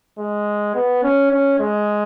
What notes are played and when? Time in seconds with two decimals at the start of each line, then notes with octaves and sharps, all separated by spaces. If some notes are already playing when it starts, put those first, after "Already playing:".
0.18 G#3
0.75 B3
1.03 C#4
1.31 C#4
1.60 G#3